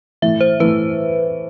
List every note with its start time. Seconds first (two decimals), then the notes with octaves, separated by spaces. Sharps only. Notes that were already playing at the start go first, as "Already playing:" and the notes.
0.22 A2 E3 A3 E5
0.41 C5
0.60 A2 E3 A3 B4